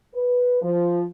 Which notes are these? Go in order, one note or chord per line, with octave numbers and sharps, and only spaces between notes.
B4
F3